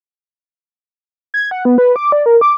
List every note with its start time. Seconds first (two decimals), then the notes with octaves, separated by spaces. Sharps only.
1.34 G#6
1.51 F#5
1.65 B3
1.78 B4
1.96 D6
2.12 D5
2.26 A#4
2.41 D6